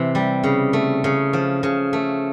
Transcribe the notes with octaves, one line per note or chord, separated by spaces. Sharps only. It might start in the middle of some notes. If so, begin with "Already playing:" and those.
Already playing: C3 E3
G3
C#3
A3
C#3
F3
C#3
A3